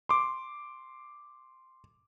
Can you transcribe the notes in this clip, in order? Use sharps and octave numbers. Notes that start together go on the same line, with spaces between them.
C6 D6